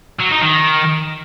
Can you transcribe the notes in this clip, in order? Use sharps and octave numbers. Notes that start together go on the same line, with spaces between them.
F#3
D#4
D#3